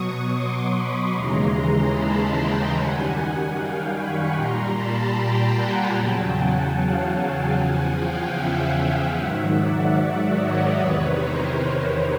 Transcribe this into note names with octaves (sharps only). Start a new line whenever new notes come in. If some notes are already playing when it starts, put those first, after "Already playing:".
Already playing: B2 F#3 C#6 D#6
C6 D6
B5 C#6
D#2 C#3 E3 G#3 A#5 C6
A5 B5
G5 A5
F#2 D#3 G3 F#5 G#5
F5 G5
B5 C#6
A#2 G3 A#5 C6
A5 B5
G5 A5
F#5 G#5
E2 C#3 F#3 G5 A5
F#5 G#5
F5 G5
F#5 G#5
E2 C#3 F3 F#5 G#5
F5 G5
E5 F#5
F5 G5
G#2 D#3 F#3 E5 F#5
D5 E5
C#5 D#5
E2 C3 D#3 B4 C#5
A#4 C5
B4 C#5